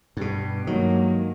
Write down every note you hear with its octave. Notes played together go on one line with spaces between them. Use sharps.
G2 B2 G3
G2 D#3 F#3 G#3 A#3